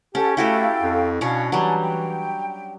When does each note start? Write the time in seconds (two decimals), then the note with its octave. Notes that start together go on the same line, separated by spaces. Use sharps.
0.15 C#4 G4 A4 F#5 A5
0.37 A3 E4 F#4 G4 A4 F5 G5
0.82 F2
1.21 B2 C#4 D4 C#5 F5
1.52 E3 F#3 G3 G#5 A5
1.81 G5